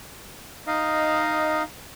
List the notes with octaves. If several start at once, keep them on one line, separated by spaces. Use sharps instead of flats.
D#4 D#5 F5